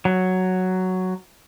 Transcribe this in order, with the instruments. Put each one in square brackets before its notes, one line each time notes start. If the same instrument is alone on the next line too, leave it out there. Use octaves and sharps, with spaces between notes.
[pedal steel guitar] F#3